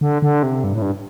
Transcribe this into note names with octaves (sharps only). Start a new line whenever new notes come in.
D3
D3
C3
G2
A2
G2